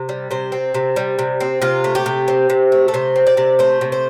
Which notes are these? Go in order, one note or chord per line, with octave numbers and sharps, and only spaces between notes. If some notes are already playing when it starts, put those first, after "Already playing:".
Already playing: C3
G3
C3 C5
C4
C3
G3
C3
C4
C3 F4
A3
G4
C3
C4
C3
A3
A4
C3 C5
C4
D5
C3
A3 C5
C3
C5